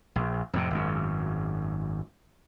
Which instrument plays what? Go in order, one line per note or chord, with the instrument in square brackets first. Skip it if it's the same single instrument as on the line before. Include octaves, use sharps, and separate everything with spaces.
[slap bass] A#1
F2 A2 C3
G#1 F#2